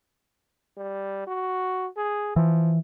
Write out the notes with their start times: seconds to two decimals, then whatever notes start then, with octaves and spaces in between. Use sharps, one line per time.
0.78 G3
1.27 F#4
1.97 G#4
2.36 E3 F3